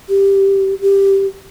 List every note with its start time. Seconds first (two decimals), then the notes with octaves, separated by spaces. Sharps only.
0.09 G4
0.81 G4